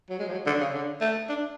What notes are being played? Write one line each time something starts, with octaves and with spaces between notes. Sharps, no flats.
F#3
G#3
F3
F#3
D3
C#3
D3
A3
D4